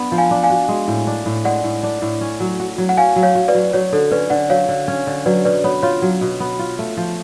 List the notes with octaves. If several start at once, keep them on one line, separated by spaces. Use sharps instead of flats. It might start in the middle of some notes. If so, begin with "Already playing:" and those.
Already playing: B3 D4
F3
F5 G#5
D4
F5 G#5
F#4
G#3
A2
D4
A2
G#3 D5 F#5
A2
D4
A2
C#4
F#3
F#4
F#3
F#5
C#4 F5 G#5
F#3
C#5 F5
F#4
B4 D5
F#3
F#3 C#5
D3 A4
C#4 B4 D5
D3 D5 F#5
F#3 C#5 F5
D3
C#4
D3
F#3 B4 D5
B2 B4 D5
B3 C#5
F4 C#5
F#3
B2
B3
F4
A3
F3